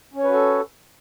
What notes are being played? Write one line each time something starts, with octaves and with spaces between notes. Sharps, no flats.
C#4 F#4 A4 B4 C#5